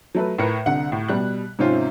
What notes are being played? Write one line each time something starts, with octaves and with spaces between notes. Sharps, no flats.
F#3 A3 B4
A2 A#4 B4 C#7
C2 D3 F#5
A2
B2 G3 F#6
G#2 C3 D#3 C4 C#4 F4